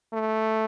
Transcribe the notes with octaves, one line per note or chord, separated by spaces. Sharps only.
A3